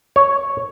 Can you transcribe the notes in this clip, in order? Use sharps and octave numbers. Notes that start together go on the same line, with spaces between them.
C#5